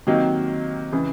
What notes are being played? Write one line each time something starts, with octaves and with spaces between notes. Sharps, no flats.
C3 D#3 F#3 A#3 D#4
C#3 E3